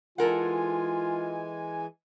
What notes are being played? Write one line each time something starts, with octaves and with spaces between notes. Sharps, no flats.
E3 G#3 F4 A4 A#4 F#5 G#5